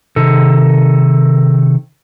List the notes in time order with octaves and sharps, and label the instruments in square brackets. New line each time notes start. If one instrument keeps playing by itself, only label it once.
[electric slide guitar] C3 D#3 A4